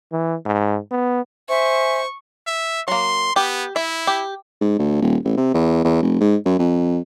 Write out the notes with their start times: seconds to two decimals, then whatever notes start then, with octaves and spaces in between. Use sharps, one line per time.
0.12 E3
0.45 G#2
0.91 B3
1.49 C5 E5 G#5 C#6
2.47 E5
2.88 F#3 A#3 C6
3.36 B3 G4
3.76 E4 E5
4.07 G4
4.61 G#2
4.79 D2
5.01 D#1
5.25 A1
5.37 C3
5.54 E2
5.84 E2
6.02 F1
6.20 G#2
6.45 F#2
6.59 F2